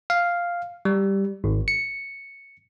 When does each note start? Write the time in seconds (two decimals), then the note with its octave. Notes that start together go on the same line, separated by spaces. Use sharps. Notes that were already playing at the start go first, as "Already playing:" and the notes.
0.10 F5
0.85 G3
1.44 G#1
1.68 C#7